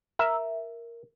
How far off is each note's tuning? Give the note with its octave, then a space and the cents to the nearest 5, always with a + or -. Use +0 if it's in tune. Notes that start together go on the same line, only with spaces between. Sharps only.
A#4 +0 E5 +0